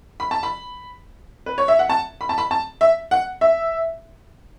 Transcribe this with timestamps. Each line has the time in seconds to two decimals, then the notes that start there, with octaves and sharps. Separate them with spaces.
0.20 B5
0.31 A5
0.43 B5
1.46 B4
1.58 C#5
1.68 E5
1.79 F#5
1.90 A5
2.21 B5
2.29 A5
2.38 B5
2.51 A5
2.81 E5
3.11 F#5
3.41 E5